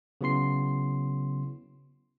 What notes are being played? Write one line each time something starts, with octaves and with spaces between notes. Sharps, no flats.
C#3 F#3 B3 E4 C6 C7